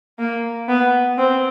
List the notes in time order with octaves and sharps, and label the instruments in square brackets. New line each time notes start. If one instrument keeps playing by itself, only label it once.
[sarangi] A#3
B3
C4